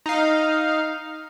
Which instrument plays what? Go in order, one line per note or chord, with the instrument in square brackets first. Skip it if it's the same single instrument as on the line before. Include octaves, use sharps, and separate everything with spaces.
[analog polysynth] D#4 F5